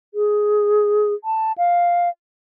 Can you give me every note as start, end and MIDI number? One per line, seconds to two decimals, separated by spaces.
0.14 1.13 68
1.24 1.52 81
1.58 2.09 77